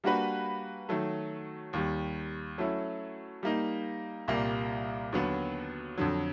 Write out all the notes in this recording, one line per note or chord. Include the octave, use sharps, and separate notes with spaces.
G3 A#3 D4 F#4 B4
D#3 F#3 A3
D#2 D#3 G3
F#3 A3 C#4 E4
G3 A#3 D#4
C2 A#2 G3 A#3
D#2 D3 F#3 B3
F2 D3 F#3